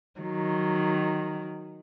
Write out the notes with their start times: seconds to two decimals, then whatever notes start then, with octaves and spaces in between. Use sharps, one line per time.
0.20 D#3 F#3